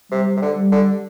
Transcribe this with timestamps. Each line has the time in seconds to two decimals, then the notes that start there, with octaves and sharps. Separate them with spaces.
0.11 C3 G3
0.36 C3
0.42 D3
0.57 G3
0.72 D3